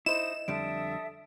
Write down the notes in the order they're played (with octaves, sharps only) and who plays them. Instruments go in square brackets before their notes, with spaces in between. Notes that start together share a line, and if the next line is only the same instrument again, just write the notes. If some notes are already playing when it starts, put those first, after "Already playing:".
[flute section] D#4 D#6 [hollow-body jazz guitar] E4 C5 [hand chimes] D#5 E5 [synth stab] E7
[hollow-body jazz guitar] F2 D3 G3 [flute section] A4 E5 D#6 [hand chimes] D7